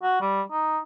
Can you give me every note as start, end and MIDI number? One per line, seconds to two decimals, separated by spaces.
0.03 0.18 66
0.21 0.42 55
0.51 0.78 63